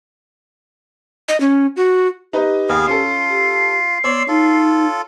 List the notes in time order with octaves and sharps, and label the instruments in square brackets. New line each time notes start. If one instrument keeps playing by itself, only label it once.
[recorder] D#5
C#4
F#4
[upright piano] D#4 B4 D#5 [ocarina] G4
[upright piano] D#2 [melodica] B3 G#4 F5
[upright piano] C#4 A4 [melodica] F4 [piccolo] C7
[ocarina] G4
[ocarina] B3 [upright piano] C#5 [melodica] D5 C6 E6
[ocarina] D#4 [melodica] F4 A4